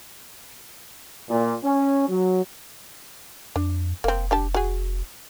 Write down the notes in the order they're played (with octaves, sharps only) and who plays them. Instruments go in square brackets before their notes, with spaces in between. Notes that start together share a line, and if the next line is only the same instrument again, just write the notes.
[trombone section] A#2
C#4
F#3
[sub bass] F2 [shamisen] D4
[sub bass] F1 [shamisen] A#3 C4
[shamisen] D4 G4 A5
F#4 G#4